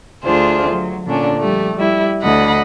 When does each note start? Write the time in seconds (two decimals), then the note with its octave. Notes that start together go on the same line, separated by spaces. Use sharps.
0.24 D2 D4 F4 G#4 C5
0.71 F#3
1.06 A#2 D3 C#4 D4
1.39 F3 G3 A3
1.75 G3 E4
2.22 D2 D#5 F#5 B5